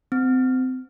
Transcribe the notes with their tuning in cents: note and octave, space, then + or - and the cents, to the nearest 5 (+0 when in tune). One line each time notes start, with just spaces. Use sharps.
C4 -25